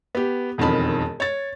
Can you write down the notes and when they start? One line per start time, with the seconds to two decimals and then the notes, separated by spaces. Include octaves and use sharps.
0.15 B3 G4
0.58 E1 F2 D#3 A5 B5
1.20 C#5 A6